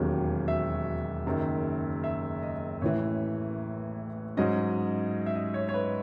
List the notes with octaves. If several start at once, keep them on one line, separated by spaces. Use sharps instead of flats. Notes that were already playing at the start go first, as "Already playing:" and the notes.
Already playing: E1 D#2 D#3 F#3 C#4
E5
F#1 F#2 D#3
E5
D#5
A1 A2 E3 C#5
G#2 F#3 C#4 D#5
E5
D#5
C#5
C#5
B4